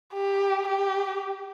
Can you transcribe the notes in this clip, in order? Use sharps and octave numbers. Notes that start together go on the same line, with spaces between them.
G4
G4